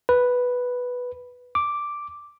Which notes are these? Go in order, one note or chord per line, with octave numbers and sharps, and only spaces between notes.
B4
D6